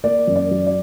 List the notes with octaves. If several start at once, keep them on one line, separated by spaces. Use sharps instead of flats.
A#3 D5
F#2
D5
F#3
D5